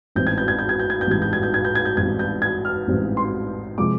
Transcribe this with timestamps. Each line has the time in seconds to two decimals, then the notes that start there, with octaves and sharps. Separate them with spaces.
0.16 A1 G#2 E3 G3 C4 G6
0.27 G#6
0.38 G6
0.48 G#6
0.59 G6
0.69 G#6
0.80 G6
0.90 G#6
1.01 G6
1.06 A1 G#2 E3 G3 C4 G#6
1.22 G6
1.33 G#6
1.43 G6
1.54 G#6
1.65 G6
1.75 G#6
1.85 G6
1.97 A1 G#2 E3 G3 C4 G#6
2.19 G6
2.42 G#6
2.65 F6
2.87 A1 G#2 E3 G3 C4
3.17 C6
3.78 C3 F3 G#3 D6